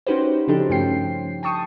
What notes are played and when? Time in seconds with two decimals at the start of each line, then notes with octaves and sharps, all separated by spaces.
0.07 C#4 D#4 F#4 G4 B4 C5
0.48 C#3 F3 D4 D#4 G4 A4
0.69 G2 F3 A3 C#4 G5 C7
1.43 G5 A5 C#6 D#6